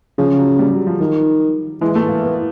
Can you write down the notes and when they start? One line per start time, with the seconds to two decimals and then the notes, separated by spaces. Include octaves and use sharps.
0.18 C#3 F3
0.39 F#3
0.59 G3
0.73 F#3
0.87 F3
1.00 D#3
1.81 E3 G#3
1.95 A3
2.09 A#3
2.23 B3